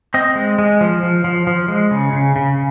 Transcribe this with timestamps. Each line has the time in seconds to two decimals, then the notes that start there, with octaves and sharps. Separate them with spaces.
0.14 C4 D#5
0.35 G#3
0.58 G#3
0.81 F3
1.03 F3
1.24 F3
1.47 F3
1.68 G#3
1.91 C#3
2.13 C#3
2.36 C#3